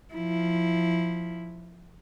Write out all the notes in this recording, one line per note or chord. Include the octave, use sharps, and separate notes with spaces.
F3 E4